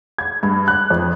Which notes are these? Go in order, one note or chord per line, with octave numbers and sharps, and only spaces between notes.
G#6
G2
F#6
F2